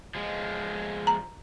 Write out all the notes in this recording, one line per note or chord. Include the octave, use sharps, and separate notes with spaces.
F3 G#3
A#5